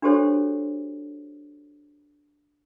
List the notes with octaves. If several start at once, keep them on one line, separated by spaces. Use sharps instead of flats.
D4 F#4 G4 A4 C5 C#5